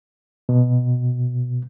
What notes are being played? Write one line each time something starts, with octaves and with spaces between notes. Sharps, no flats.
B2